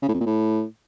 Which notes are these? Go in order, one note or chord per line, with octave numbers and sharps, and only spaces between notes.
C#3
A2
F2
A#2
A2